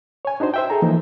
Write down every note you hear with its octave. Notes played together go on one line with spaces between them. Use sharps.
C#5 G#5
D4 D#4 F#4 C5
C5 E5 G5
G#4 A4 A#5
E3 F3 A#3 D#4 E4